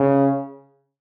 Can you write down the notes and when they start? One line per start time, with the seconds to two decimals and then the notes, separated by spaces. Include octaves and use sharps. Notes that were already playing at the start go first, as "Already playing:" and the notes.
Already playing: C#3